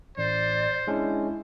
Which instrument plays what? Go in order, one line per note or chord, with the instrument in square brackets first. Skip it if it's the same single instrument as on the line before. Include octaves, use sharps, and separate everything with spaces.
[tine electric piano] A1 [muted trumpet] C5 [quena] D5
[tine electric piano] G#3 C#4 D4 [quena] E4